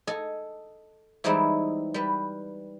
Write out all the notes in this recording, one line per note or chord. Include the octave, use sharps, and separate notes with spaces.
A4 D#5 G#5
E3 G3 G#3 C4 D#4 E4
G3 B4